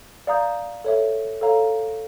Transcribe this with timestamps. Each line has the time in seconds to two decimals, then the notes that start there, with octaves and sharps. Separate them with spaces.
0.27 D5 F5 A#5 D#6 G6
0.84 A4 C#5 E5
1.41 A4 C#5 F5 A#5